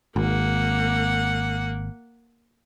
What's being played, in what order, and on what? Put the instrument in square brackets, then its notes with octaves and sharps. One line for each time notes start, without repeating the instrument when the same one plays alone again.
[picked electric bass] G#1 [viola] A#3 F#5